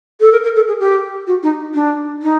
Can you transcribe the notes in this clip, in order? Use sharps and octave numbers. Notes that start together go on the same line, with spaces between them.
A4
A#4
A#4
A4
G#4
G4
F#4
D#4
D4
D#4